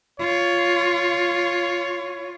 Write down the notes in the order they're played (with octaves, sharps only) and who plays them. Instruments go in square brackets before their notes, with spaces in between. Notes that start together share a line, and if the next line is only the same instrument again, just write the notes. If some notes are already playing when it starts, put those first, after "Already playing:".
[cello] F4 [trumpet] C#5